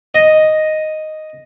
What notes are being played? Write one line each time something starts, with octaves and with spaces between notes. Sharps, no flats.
D#5